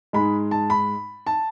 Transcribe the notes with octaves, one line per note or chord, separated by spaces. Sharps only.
G#2 G#3 B5
A5
B5
A5